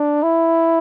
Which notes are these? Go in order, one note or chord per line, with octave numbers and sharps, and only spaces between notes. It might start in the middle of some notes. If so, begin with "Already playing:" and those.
Already playing: D4
E4